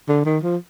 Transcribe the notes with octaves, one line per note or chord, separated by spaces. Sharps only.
D3
D#3
F3